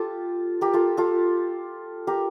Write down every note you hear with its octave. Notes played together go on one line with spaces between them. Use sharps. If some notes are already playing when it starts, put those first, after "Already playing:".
Already playing: F4 G4 A4
G4 A#4
F4 A4
F4 A4
G4 A#4